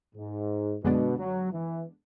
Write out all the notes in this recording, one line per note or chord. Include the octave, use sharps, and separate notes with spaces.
G#2
F#2 B2 D3 G#3 B3 D4
F#3
E3